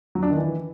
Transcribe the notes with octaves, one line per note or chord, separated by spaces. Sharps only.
F#3
D4
D#3
E3